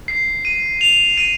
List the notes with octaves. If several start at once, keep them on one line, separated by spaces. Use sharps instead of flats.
C7
D#7
F7
D#7